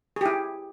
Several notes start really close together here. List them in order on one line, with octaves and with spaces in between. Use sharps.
G#4 G4 E4